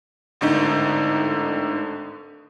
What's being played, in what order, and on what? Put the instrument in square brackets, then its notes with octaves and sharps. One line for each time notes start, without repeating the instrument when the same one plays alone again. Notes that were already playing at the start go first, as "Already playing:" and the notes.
[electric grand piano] G#1 A2 D3 D#4